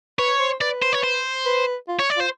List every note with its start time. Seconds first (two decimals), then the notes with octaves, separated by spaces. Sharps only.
0.18 B4 C#5
0.39 C5
0.61 B4 D5
0.82 C5
0.93 C#5
1.04 C5
1.46 B4
1.88 F4
1.99 C#5
2.10 D5
2.17 F4 C5